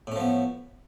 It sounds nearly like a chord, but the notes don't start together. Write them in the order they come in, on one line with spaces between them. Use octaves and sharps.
A2 C#4 F3 B3